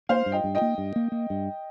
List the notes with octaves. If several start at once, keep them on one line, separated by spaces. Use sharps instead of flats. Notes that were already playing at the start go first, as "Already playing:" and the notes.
A#3 C5 F5
G2
D#5 G5
G2
D#5 G5
A#3
G2
A#3
A#3
G2